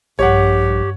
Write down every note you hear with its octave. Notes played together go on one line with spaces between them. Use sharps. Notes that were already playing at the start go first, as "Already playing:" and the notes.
A#1 G2 G4 C#5 F#5